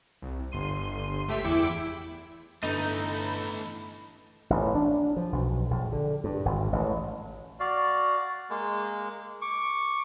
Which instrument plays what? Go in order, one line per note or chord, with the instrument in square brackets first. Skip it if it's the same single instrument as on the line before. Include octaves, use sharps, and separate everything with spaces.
[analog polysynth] C2
G1 C6 D#7
C#2 A3 G4 E5 C6 B6
E2 E4 E5 G5 D6 C#7
[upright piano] G1 [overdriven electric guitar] E3 A3 [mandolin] D#4 [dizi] B5
[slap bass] A1
D4
F3
B1
A#1
D3
G2
G#1
A1
[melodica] F#4 D5 F5
G#3 A#3
C#6 D6